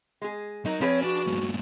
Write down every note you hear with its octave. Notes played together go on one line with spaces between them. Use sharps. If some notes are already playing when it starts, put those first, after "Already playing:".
G#3 G#4
F#3 D#4 A#4
F3 C4 G#4 B4 C#5
D4 F#4 A5
G2 A#2